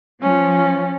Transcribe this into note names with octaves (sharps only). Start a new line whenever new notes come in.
F3 C#4